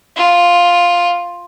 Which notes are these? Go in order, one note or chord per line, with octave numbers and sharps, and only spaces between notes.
F4